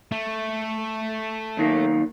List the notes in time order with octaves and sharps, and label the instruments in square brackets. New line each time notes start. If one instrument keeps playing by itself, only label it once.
[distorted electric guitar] A3
[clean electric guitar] B1 D#3 A#3